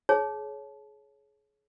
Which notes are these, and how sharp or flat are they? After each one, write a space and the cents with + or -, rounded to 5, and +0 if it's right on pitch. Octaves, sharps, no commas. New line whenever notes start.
G#4 +30 C#5 +0 A5 -25